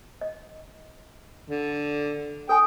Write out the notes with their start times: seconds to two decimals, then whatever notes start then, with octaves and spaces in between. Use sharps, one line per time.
0.21 D#5
1.50 D3
2.49 A4 G5 G#5 D#6